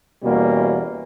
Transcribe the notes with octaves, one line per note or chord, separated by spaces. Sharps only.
E2 B2 G3 A#3 C#4